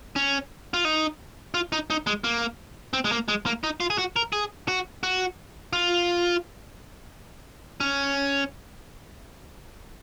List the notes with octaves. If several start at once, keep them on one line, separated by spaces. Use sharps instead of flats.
C#4
F4
D#4
F4
D#4
D#4
G#3
A#3
C4
G#3
A#3
G#3
A#3
D#4
F4
G#4
F#4
A#4
G#4
F#4
F#4
F4
C#4